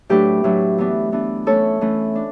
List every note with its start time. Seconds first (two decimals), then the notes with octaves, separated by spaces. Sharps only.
0.09 A2 F#3 A3 D4 G4 B4
0.44 A2 F#3 A3 D4
0.78 E3 B3 D4
1.12 E3 B3 D4
1.46 E3 A3 C#4 A4 C#5
1.81 E3 A3 C#4
2.15 D4